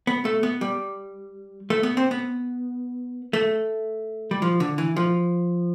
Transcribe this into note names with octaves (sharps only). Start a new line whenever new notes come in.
B3
A3
B3
G3
A3
B3
C4
B3
A3
G3
F3
D3
E3
F3